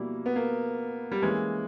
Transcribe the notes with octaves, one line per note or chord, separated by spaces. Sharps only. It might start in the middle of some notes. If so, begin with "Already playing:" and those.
Already playing: B2 G3 A#3 E4
B3
A#3
G3
E3 G#3 A#3 C#4